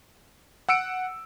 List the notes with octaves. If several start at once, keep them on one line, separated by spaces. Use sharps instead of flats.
F#5 E6 C#7 D7